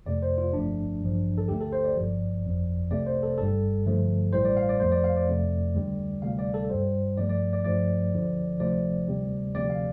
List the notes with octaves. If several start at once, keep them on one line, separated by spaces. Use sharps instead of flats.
F2 C3 A3 D5
C5
F4
G1 G2 F3 A3 D4
A1 G2 F3
A4
D2 D3 A3 G4
A4
C5
D5
G1 G2 F3
G1 F2 F3
C2 C3 A3 D5
C5
A4
G1 G2 G3 A4
G2 D3 F3 A3
A1 A2 G3 C5
D5
F5
D5
F2 F3 A3 C5
D5
F5
D5
F2 C3 A3
D2 D3 G3
D2 C3 G3 F5
D5
A4
G2 G3 C5
G2 F3 A3 D5
D5
D5
G2 F3 A3 D5
D2 D3 F3
D2 C3 F3 A3 D5
D2 C3 G3
D2 C3 F3 D5
F5